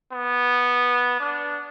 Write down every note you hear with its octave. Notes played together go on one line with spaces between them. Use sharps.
B3
D4